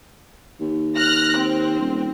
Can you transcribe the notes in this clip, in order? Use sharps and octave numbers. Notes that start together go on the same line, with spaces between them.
D#2
F6 F#6 A#6
C4
D#1